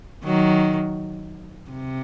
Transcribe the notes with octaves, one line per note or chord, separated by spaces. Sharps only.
D#3 F#3
C3